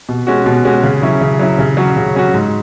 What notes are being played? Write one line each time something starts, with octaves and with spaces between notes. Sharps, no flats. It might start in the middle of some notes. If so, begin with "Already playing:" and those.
B2
G#3 C#4 F#4
B2
G#3 C#4 F#4
C#3
F#3 C#4 E4
C#3
F#3 C#4 E4
C#3
F#3 C#4 F#4
C#3
F#3 C#4 F#4
G#2